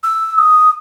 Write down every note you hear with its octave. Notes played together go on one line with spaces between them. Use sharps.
E6
D#6